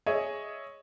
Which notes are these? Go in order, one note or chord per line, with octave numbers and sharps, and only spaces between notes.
G#4 C#5 D#5 E5